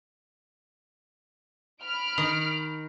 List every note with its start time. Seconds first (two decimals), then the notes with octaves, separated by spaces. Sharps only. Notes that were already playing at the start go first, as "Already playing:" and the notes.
1.82 B5 F6 D7
2.18 D#3